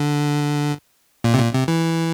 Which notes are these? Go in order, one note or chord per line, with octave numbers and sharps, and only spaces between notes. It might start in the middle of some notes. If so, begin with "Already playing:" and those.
Already playing: D3
A#2
C3
A#2
C3
E3